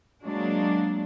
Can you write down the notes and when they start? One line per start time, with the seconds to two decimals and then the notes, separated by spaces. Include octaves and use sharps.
0.24 F#3 G#3 A#3 D4